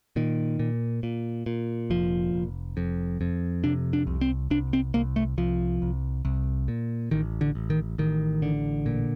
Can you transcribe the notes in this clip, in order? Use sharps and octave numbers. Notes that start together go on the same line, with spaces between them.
A#2 D#3
A#2
A#2
A#2
F1 F3
F1
F2
F2
C3 D4
D4
C2
C4
C2 D4
C4
C2 A#3
A3
C2 F3
C2
C2
A#2
A1 D#3
D3
A1
D#3
A1 D#3
D3
A#2